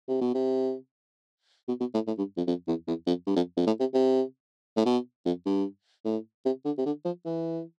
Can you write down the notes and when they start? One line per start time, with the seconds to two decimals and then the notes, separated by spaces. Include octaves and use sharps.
0.08 C3
0.21 B2
0.35 C3
1.68 B2
1.80 B2
1.94 A2
2.07 A2
2.18 G2
2.37 F2
2.47 F2
2.68 E2
2.88 E2
3.07 F2
3.27 G2
3.36 F2
3.57 F2
3.67 A2
3.80 C3
3.94 C3
4.76 A2
4.86 B2
5.26 F2
5.46 G2
6.05 A2
6.45 C3
6.65 D3
6.78 C3
6.86 D3
7.05 F3
7.26 E3